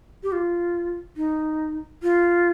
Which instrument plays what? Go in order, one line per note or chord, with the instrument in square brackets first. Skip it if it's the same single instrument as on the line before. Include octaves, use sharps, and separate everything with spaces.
[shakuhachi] G4
F4
D#4
F4